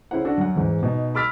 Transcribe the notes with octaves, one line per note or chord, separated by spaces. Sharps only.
C#3 C#4 E4 C5 F#5
D4 F#4 A4
F#2 F#5
E2 G#2
B2 D#4
B5 D6 E6 F6 A6 B6